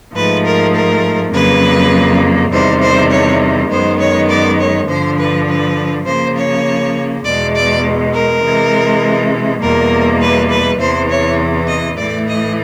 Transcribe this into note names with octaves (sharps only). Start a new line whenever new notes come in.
G#2 F3 A3 B4
A#4
A#4
F2 C#3 F#3 A#3 B4
E2 C3 D#3 G3 C5
C5
C#5
F#2 D#3 G#3 B3 C5
C#5
D5
C#5
G2 D3 F3 C5
B4
B4
C#3 F3 A#3 C5
C#5
E2 B2 G#3 D5
D5
A#4
C3 E3 G#3
E2 B2 G3 A#3 A#4
B4
B4
E2 C3 E3 C5
C#5
D#5
A2 E3 A3 D5
D#5